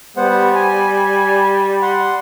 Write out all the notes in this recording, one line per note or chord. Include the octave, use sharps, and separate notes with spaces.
G3 B3 C5 F#5
G#5
F#5 C6